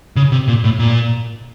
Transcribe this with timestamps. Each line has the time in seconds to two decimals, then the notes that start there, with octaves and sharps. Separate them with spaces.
0.16 C#3
0.32 C3
0.48 A#2
0.64 A2
0.79 A#2